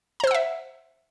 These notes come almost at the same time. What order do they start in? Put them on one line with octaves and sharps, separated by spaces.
A#5 C5 E6 F#5 E5